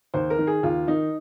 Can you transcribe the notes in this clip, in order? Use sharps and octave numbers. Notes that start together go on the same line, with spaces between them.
D#2 C5
A#4
D#3
G#4
D#2 F4
D#3 D#4